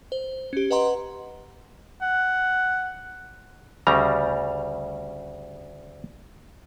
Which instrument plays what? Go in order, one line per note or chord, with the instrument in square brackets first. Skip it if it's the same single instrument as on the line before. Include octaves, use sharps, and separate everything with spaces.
[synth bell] C5
C#4 G4
B4 D#5 F#5 A#5 C6
[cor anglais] F#5
[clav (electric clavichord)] D2 C#3 G3 A#5